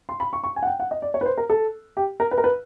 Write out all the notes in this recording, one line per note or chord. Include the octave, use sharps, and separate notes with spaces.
C6
B5
C#6
C#6
G#5
F#5
G5
F#5
D#5
D5
C#5
B4
C5
A#4
A4
G4
A#4
B4
A#4
B4